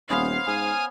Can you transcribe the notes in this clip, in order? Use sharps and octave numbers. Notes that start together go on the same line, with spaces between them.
D#1 B3 C#4 C5 F5
G#2 G#5 D#6 F6